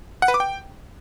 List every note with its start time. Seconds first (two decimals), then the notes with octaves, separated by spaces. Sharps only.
0.22 F#5
0.28 B4
0.34 D6
0.40 G5